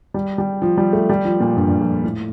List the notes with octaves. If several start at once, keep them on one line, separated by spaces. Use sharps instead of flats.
G3
G3
F3
G3
A3
G3
F3
A#2
G2
G2
F2
A2